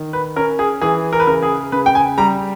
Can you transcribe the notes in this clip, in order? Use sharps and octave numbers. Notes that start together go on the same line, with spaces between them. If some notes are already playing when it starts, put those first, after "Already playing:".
Already playing: D#3
B4
C#4 A#4
G#4
E3 G#4
A#4
B4
C#3 A#4
G#4
C#3 B4
G5
G#5
G3 A#5